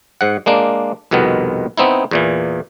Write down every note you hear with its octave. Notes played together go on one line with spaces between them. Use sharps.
G#2 F#5
G#3 A#3 D4
C2 F2 B2 D#3 B3
B3 C4 D#4 E4
E2 A#2 E3